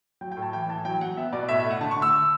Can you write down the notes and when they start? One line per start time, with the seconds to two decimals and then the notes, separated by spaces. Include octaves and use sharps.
0.21 F#3 G5
0.32 G5
0.37 A2
0.42 A5
0.53 E3 G5
0.69 E3 A5
0.85 F#3 G5
1.01 F#3 F#5
1.17 B3 E5
1.32 B2 D5
1.49 A2 E5
1.60 E5
1.64 A3
1.71 F#5
1.81 D3 A5
1.91 C#6
1.96 D3
2.02 E6